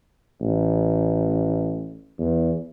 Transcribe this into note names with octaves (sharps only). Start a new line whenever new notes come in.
A1
E2